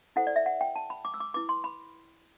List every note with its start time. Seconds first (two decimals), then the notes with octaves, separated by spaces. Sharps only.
0.16 E4 A4 C5 F#5
0.27 D5
0.36 E5
0.46 F#5
0.61 G5
0.76 A5
0.90 B5
1.05 D6
1.14 E6
1.20 D6
1.34 E4 B4 D6
1.49 C6
1.64 B5